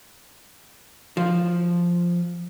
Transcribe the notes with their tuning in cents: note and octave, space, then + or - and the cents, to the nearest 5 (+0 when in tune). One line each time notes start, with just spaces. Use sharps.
F3 +0